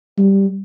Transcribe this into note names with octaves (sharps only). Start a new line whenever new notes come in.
G3